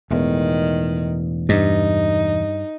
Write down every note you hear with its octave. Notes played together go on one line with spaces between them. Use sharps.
E1 E2 A2 D#3
G2 D#4